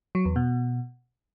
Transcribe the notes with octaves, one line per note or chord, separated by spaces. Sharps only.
F#3
E2
B2